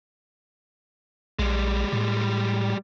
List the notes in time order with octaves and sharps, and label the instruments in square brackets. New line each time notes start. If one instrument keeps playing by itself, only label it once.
[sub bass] A#1 [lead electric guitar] G3 G#3
[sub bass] A2